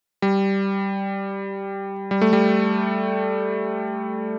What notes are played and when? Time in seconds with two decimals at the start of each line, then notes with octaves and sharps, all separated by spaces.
0.22 G3
2.11 G3
2.21 A3
2.33 G3